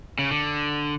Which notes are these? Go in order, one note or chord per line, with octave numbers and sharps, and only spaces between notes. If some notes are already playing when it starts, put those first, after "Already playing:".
C#3
D3